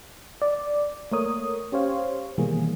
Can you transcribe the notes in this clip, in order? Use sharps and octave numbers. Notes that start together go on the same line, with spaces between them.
D5
A3 A#3 A#4 C#5 D#6
C#4 G4 C5 C#5 F5
B2 D#3 E3 G3 A#3 G#4